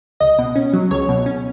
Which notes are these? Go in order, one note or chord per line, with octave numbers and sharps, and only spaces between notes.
C#2 D#5
B2
C#4
F#3
C#2 C#5
B2
C#4